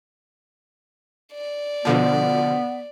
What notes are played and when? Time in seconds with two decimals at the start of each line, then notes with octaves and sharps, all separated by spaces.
1.33 D5
1.85 B2 D3 F3 B3